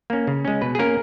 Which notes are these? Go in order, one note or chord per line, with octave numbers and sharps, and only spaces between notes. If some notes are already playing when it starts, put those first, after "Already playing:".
A#3 C#4
C#3
G#3 C#4
B2 B4
G#4
A#3 C#4 A#4